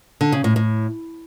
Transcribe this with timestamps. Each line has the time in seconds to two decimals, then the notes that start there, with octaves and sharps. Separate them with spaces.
0.21 D3
0.32 C#3
0.44 A2
0.56 A2